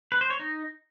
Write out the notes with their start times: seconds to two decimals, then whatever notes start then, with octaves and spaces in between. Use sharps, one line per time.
0.12 B4
0.21 C5
0.30 C#5
0.39 D#4